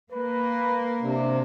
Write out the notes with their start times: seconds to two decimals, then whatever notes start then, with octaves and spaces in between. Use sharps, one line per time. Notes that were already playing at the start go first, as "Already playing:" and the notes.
0.12 A#3 B4
1.02 C3 D4